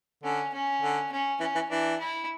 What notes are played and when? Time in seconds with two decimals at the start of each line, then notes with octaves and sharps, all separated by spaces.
0.23 D3 C#4
0.53 C#4
0.82 D3
1.11 C#4
1.40 E3 C#4
1.55 E3
1.70 E3 D4
1.99 E4